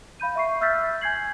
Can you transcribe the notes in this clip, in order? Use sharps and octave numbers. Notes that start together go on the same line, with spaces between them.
F5 B5 G6 D#7
E5 C#6 C7
E5 E6 F6 G6 A6 B6
G#5 G6 G#6 C7 F#7